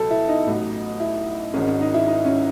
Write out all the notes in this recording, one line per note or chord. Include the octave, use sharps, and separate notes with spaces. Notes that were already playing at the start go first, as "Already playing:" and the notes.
Already playing: C#2 B2 F#3 A4
E4
D#4
A1 A2 F#3
E4
G#1 G#2 D#3 C#4
C#4
D#4
E4
D#4
C#4